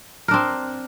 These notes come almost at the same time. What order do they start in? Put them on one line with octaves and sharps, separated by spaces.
A#4 D4 C4